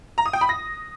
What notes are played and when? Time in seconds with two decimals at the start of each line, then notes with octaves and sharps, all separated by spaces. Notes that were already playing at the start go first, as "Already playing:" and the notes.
0.18 A#5
0.26 D#6
0.33 G5
0.41 B5
0.49 A#6